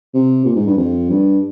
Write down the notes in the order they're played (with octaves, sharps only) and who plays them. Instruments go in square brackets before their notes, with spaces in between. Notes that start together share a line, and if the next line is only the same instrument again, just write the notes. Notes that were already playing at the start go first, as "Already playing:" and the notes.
[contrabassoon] C3
A#2
G#2
G2
F2
G2